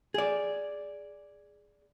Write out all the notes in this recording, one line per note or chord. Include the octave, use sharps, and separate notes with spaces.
G#4 D5